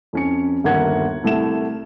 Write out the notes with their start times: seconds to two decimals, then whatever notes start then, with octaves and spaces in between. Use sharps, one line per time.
0.13 F2 C#4 C#7
0.64 G1 D#2 A#4 F#5 G#6
1.24 C2 A3 F#5 E7